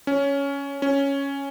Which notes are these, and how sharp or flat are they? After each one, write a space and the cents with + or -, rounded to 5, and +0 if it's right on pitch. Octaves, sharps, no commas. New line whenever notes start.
C#4 +10
C#4 +0